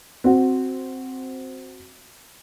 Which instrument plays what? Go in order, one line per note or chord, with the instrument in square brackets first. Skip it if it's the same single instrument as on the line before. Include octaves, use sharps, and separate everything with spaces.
[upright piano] C4 F#4